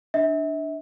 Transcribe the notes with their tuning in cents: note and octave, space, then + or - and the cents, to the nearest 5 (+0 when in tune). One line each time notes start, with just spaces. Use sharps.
D4 +5 E5 -35